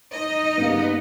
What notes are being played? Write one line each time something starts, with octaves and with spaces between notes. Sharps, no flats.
D#4 D#5
G2 C#3 A#3 B3